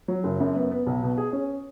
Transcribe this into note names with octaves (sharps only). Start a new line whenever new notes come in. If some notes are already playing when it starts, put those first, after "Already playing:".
F#3
F#1
F#2
B3
B3
B1
B2
G#4
C#4